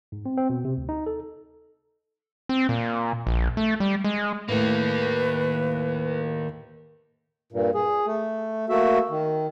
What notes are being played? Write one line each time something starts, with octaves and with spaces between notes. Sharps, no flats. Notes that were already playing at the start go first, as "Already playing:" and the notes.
G#2
C4
C4
B2
C3
D2
D#4
A4
C4
A#2
A#1
A3
G3
G#3
A2 D#3 A3 A#3 B4
G2 A#2
G#4
A3
A3 A#3 F#4 E5
D#3